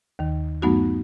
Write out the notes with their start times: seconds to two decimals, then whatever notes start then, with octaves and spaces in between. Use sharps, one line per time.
0.19 D#2 D#3
0.62 G2 F#3 A3 B3 D#4 F#4